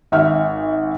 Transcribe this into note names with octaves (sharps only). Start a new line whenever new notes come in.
G#1 E5 F#5 F6